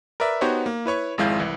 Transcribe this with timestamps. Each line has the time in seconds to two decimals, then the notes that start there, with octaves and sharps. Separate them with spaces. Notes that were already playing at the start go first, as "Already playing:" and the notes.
0.20 A#4 B4 D5 E5
0.41 B3 D#4 F#4 G4 C5 C#5
0.66 A#3
0.86 E4 B4 C#5 C#6
1.18 G#1 F2 G#3 E4 F5 G6
1.39 C2 E3